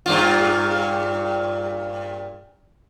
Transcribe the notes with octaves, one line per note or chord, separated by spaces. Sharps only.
G2 A#2 F4